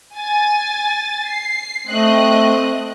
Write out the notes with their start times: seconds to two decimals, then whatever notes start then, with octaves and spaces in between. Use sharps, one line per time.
0.15 G#5 A6
1.28 C7
1.87 A3 C4 D#5 F#6